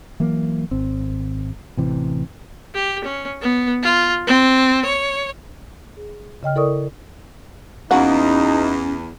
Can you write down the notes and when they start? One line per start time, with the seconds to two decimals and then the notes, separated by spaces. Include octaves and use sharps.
0.20 E3 F#3 A#3
0.71 G#1 C4
1.77 A1 C3 E3
2.75 G4
3.04 C#4
3.42 B3
3.83 F4
4.27 C4
4.86 C#5
5.97 G#4
6.43 C#3 D#5 G5 F6
6.55 E4 A4 A#4 D5 C#6 D#6
7.91 E2 A#3 C#4 D#4 F#4 F#5